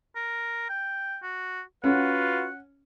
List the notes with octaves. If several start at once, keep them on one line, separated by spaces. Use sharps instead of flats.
A#4
G5
F#4
C#4 F4 F#4 B4 F#5